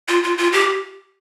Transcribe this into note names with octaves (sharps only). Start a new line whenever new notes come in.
F4
F4
F4
G4